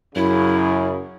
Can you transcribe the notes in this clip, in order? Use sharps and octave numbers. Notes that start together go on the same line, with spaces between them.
F#2 C#3 E4